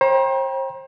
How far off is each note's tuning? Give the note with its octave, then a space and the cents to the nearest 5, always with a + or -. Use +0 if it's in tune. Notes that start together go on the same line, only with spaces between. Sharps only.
C5 +40 G5 +0 A#5 +40